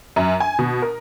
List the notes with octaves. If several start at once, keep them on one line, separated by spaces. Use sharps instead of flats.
F#2
G#5
B2
A#4